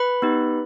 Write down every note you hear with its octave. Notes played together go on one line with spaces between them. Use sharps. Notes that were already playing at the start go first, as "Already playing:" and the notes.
Already playing: B4 B5
B3 D#4 G4